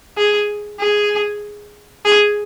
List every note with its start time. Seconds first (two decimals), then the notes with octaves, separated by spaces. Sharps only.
0.17 G#4
0.80 G#4
2.05 G#4